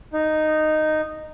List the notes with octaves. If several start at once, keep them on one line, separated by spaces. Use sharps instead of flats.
D#4